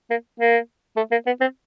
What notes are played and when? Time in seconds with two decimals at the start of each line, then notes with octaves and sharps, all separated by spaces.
0.10 A#3
0.40 A#3
0.97 A3
1.11 A#3
1.26 B3
1.41 C4